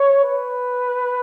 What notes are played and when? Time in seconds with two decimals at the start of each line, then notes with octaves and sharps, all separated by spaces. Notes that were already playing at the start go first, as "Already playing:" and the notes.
Already playing: C#5
0.24 B4